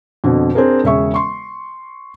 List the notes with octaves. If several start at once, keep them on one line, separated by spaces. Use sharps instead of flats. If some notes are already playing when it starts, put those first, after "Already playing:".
F2 B2 D3
C4 D4 G#4 A#4
E1 C#3 G#4 E5 C#6
C6 C#6